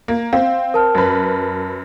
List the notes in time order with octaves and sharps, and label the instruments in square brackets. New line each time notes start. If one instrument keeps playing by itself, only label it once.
[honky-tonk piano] A#3
[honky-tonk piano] C4 [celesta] F5
[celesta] A#4 A5 F6
[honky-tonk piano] F#2 B4